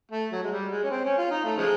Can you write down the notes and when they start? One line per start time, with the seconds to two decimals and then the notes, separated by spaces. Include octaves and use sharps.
0.12 A3
0.32 F#3
0.43 G#3
0.52 G3
0.71 G#3
0.84 C#4
0.91 C4
1.05 C#4
1.18 F4
1.31 D#4
1.45 A3
1.57 C#3 F3 G#3